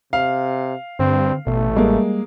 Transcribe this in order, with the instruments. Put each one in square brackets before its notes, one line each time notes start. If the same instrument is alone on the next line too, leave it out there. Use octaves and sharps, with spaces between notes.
[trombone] C3 [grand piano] F5
[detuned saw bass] G2 [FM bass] D3 [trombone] C4
[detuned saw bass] A1 [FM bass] B2 [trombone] A3
[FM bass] G3 [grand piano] G#3 A#3